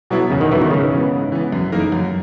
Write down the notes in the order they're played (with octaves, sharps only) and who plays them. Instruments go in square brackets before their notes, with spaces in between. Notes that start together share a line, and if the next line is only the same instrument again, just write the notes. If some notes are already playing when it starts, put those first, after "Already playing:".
[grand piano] B2 F#3 B3 E4
[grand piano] E2 [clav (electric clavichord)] C#3
[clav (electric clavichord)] D#3
[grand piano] B2 F#3 B3 E4 [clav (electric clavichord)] E3
[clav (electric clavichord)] D#3
[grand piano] G#2 [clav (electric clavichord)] C#3
[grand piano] E3 B3
G#2
E3 B3
F#2
E3 A#3 D#4 A#4
F#2